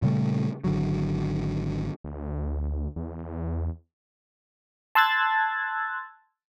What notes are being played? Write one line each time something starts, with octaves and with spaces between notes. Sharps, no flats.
A#2 C#3 G3 A3
G#1 D3 F#3
D2
E2
A5 C6 E6 F#6 G#6 A6